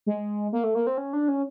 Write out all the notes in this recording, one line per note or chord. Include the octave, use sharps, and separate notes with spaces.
G#3
A#3
A3
A#3
C4
C#4
D4
C#4